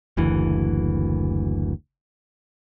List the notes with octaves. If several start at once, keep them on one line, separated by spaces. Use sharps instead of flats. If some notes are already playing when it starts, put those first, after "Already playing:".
F#1 D2 E3